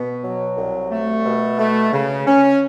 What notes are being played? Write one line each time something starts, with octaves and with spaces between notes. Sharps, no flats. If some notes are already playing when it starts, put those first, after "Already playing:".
Already playing: B2 B3
F#3
C2
A3
B2
A3
C#3
C#4